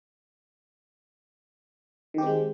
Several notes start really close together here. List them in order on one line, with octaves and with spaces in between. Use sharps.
D#3 G4 C4 G#3